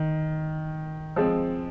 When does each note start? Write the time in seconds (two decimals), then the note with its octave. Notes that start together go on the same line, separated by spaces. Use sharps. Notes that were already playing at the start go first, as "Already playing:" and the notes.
Already playing: D#3
1.16 F3 G#3 C4